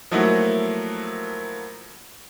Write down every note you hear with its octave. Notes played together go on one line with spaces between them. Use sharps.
F3 F#3 A3 A#3 E4 F#4